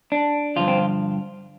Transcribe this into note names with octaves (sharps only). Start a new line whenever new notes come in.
D4
G2 D3 F3 F4
C4